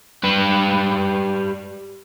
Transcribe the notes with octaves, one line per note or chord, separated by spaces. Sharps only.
G3 B4